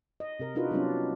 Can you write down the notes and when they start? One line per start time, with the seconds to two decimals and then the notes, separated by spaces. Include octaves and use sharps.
0.20 D#5
0.40 C3 A#4
0.55 D4 D#4 F4 F#4 A#4 B4
0.71 F#3 G3 B3 C#4 D4 F4